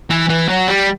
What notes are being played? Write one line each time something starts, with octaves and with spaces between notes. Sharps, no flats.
E3
E3
F#3
G3